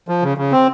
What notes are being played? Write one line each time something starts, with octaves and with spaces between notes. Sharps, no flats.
F3
C#3
C#3
C4